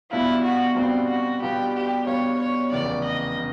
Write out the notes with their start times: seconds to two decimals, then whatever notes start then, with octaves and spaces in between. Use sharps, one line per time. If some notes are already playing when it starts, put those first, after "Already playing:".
0.11 B2 G3 B3 D4 E4 F4
0.44 F#4
0.76 B2 G3 B3 C4 D4 F4
1.08 F#4
1.42 B2 G3 B3 D4 F4 G4
1.74 G4
2.06 B2 G3 B3 D4 F4 C#5
2.39 C#5
2.72 F1 E2 C#3 D5
3.04 D#5
3.37 C#3